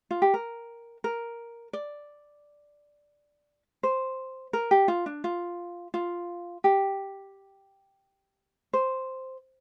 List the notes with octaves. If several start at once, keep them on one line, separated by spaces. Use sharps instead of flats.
F4
G4
A#4
A#4
D5
C5
A#4
G4
F4
D4
F4
F4
G4
C5